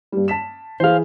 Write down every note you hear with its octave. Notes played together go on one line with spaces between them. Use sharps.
G2 G3
A5 B6 E7
E3 G#4 C5 F5